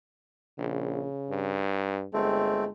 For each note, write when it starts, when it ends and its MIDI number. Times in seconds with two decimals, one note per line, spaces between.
0.59 1.05 34
0.59 1.65 49
1.30 2.06 43
2.13 2.69 31
2.13 2.68 56
2.13 2.65 57
2.13 2.65 60